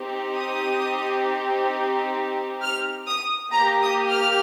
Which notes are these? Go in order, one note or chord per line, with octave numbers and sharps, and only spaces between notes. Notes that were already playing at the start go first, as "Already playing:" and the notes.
Already playing: C4 D#4 G4
D#6
F6
D#6
A#3 G4 A#5
D#6
F6